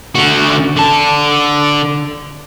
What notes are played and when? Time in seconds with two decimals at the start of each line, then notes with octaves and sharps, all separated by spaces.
0.15 D3 F#4
0.76 D3 A5